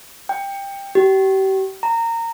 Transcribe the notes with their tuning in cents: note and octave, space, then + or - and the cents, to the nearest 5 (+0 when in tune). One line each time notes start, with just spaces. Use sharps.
G5 +15
G4 -35
A#5 -20